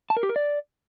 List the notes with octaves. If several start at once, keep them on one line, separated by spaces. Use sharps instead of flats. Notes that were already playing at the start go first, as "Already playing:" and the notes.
A5
A#4
G4
A#4
D5